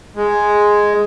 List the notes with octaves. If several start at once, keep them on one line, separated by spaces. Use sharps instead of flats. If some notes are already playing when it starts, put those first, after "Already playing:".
G#3